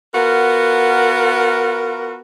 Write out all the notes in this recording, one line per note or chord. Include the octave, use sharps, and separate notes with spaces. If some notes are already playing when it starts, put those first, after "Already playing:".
B3 F4 F#4 A#4